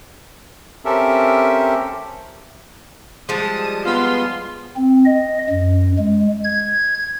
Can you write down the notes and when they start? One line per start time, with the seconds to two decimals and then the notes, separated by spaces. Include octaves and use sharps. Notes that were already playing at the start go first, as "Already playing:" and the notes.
0.85 C4 C#4 G4 A4 A#4 E5
3.29 F3 G3 G#3 A5 D#6
3.85 B3 F4 C6
4.76 C4
5.05 D#5
5.50 F#2
5.98 G#3
6.44 G#6